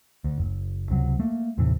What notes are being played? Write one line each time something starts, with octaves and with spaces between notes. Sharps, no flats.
D2
F#1
C#2 C3 D#3 F#3
A3 A#3
D#2 A2 C3 E3